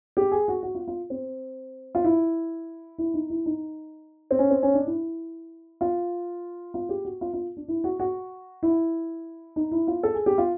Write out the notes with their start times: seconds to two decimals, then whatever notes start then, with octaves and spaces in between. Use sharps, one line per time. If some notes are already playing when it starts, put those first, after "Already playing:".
0.17 G4
0.32 G#4
0.48 F#4
0.63 F#4
0.75 F4
0.88 F4
1.10 C4
1.95 F4
2.04 E4
2.98 E4
3.14 D#4
3.30 E4
3.46 D#4
4.31 C4
4.39 C#4
4.51 C4
4.63 C#4
4.74 D4
4.87 E4
5.81 F4
6.74 F4
6.89 G4
7.05 F#4
7.21 F4
7.33 F4
7.57 D4
7.68 E4
7.84 F#4
8.00 F#4
8.63 E4
9.56 D#4
9.72 E4
9.87 F4
10.03 A4
10.14 G#4
10.26 G4
10.38 F4